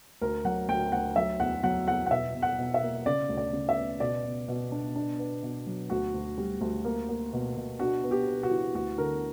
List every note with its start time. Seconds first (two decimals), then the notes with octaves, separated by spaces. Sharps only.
0.21 D2 A#4
0.45 F#3 F#5
0.69 D2 G5
0.92 D2 F#5
1.16 F#3 E5
1.40 E2 F#5
1.64 F#3 F#5
1.87 E2 F#5
2.06 F#5
2.11 B2 E5
2.35 B2
2.42 F#5
2.58 B2
2.74 E5
2.82 A#3
3.06 C#3 D5
3.29 D2
3.37 D5
3.53 C#3
3.69 E5
3.77 B3
4.00 B2 D5
4.24 B2
4.48 B2
4.72 D4
4.96 D4
5.19 B3
5.43 B2
5.67 F#3
5.90 D2 F#4
6.14 D2
6.38 G3
6.61 D2
6.85 A#3
7.09 A#3
7.33 B2
7.56 B2
7.79 D4 F#4
8.04 B3
8.11 G4
8.27 B3
8.43 F#4
8.51 E3
8.75 D2 F#4
8.98 D3 A#4